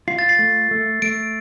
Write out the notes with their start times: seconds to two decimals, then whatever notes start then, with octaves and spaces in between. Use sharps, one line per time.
0.08 F4 C7
0.19 A6
0.29 C7
0.39 A3
0.71 A3
1.02 A3 D7